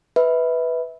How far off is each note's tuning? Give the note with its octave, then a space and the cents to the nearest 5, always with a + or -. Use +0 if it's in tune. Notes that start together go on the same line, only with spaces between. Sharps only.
B4 +0 E5 -25